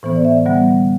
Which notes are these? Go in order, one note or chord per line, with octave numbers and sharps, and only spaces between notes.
A2 E3 B3 C5
D5
E5
D3 G3 B3 F#5